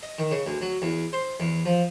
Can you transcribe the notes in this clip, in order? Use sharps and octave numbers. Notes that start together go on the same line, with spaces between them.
D#5
D#3
C#3
D2
F#3
E2
C5
E2
F3